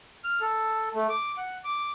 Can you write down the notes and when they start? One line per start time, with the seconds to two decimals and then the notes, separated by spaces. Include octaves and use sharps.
0.24 F6
0.41 A4
0.94 A3
1.09 D6
1.37 F#5
1.64 D6